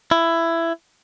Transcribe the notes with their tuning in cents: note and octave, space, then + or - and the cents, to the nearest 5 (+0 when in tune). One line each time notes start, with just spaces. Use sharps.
E4 +15